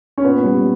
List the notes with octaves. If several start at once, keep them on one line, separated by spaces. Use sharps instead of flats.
C#4
A#2 B3
G3